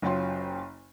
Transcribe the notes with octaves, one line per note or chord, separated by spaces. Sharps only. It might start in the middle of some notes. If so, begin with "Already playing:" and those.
F#1 F#3 C#4 F4 G5 C6